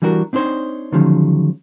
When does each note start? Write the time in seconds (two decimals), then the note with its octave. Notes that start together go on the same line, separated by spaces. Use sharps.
0.02 E3 G3 D4 F#4 A#4
0.33 C4 D4 D#4 C5 C#5
0.92 D3 D#3 F3 F#3 G#3 C#4